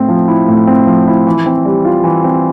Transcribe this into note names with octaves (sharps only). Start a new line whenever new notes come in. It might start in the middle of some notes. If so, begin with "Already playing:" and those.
Already playing: A2 C4
F3
E4
A2
C4
F3
E4
E3
C4
G3
F4
E3
C4